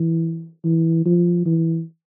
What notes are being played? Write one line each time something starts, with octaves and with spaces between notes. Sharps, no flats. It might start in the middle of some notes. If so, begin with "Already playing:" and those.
Already playing: E3
E3
F3
E3